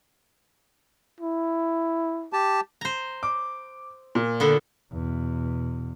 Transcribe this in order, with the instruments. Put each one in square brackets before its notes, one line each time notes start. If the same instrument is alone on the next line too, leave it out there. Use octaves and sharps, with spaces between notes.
[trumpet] E4
[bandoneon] G4 A5
[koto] C5 A#5
[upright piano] D6
A#2
[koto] D3 B3 A4
[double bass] E2 B2